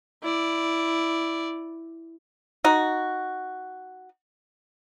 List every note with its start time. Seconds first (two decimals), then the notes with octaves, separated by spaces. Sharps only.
0.23 E4 D5
2.64 D#4 F#4